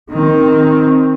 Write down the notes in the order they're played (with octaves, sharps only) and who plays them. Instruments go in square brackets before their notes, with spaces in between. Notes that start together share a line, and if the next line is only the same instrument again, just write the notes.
[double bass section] D#3 C4